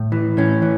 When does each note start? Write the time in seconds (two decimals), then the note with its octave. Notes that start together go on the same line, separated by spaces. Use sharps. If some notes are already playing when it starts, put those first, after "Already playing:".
Already playing: A2
0.12 E3
0.37 A2 C#4
0.62 E3